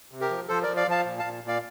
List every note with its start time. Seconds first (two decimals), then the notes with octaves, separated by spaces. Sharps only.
0.12 C3
0.21 G4 A#4
0.30 F3
0.48 F3 A4 C5
0.62 F3 A#4 D5
0.77 D5 F5
0.87 F3 F5 A5
1.05 A#2
1.19 A#2 F5 A5
1.44 A#2 D5 F5